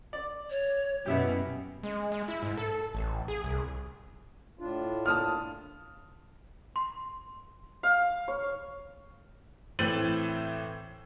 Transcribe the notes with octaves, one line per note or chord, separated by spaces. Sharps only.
D5
C#5
F#2 B2 B3 C#4 E4 G4
G#3
G#3
E4
G#2
A4
A1
G#4
C2
A2 D4 F4
A5 D#6 F6
C6
F5
C#5
A2 E3 C4 A6 D#7 F#7